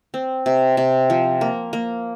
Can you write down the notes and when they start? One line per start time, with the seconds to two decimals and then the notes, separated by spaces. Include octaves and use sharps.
0.14 C4
0.46 C3
0.77 C3
1.10 F3
1.41 A#3
1.73 A#3